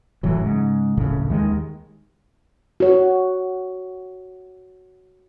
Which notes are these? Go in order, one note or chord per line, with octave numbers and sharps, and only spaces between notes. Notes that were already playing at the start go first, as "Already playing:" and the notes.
G1 A2 E3 F#3
G#2 C#3
D1 A#1 A2 C#3
D#2 D#3 G#3
F#4 C#5